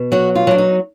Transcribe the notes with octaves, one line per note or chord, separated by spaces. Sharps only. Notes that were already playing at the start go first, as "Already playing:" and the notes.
Already playing: B2
F#3 F#4
F4
F#3 D4
D#4